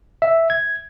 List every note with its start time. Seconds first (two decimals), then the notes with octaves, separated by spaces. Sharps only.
0.22 E5
0.50 G#6